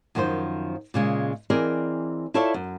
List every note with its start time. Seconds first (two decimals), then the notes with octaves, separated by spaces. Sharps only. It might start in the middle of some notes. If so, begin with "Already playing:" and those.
0.15 F#2 D#3 F3 G#4 C5
0.94 A#2 C#3 G#3
1.50 E3 C4 G#4 A#4 D5 D#5
2.34 E4 F4 A4 C#5 D5 E5
2.54 F#2